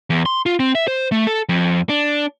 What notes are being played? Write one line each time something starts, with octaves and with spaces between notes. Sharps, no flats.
E2
C6
F4
C4
E5
C5
A3
A4
F2
D4